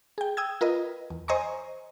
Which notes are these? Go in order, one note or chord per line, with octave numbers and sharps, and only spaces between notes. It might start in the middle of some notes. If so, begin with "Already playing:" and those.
G#4 G5
G5 D#6 E6 G#6
F4 A#4 B4 D#5
E2
C5 D#5 G#5 A#5 C#6